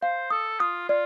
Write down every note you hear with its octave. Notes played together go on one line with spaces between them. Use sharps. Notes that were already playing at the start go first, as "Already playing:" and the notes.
C5 F5
A4 D#6
F4 D#6
F4 D5